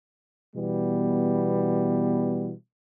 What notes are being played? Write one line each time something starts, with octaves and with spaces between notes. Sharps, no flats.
B2 E3 G3 B3